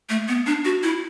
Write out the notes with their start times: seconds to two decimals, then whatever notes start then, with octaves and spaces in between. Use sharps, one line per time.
0.09 A3
0.28 B3
0.46 D4
0.65 F#4
0.83 E4